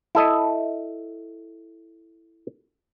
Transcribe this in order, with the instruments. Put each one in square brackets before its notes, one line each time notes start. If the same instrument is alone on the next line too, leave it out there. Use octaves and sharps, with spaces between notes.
[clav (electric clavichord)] E4 A4 D#5